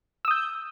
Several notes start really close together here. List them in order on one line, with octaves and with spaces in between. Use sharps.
E6 D#6 G6